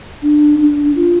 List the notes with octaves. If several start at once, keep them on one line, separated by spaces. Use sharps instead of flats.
D4
D4
F4